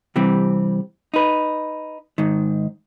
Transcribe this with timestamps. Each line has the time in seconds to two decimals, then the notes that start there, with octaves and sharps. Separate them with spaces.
0.16 C3 E3 G3 C4
1.14 D#4 B4
2.18 G#2 D#3